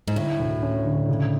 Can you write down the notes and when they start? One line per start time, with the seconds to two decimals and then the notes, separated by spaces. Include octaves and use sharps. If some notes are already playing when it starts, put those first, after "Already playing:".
0.08 G#2
0.16 A2 D3
0.39 D2
0.63 C#4
0.86 D3
1.09 C#3